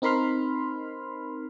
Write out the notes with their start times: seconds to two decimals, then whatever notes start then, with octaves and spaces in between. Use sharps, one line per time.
0.02 C4 D#4 A#4 B5 C6 F6